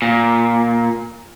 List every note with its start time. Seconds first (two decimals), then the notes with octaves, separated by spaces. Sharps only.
0.02 A#2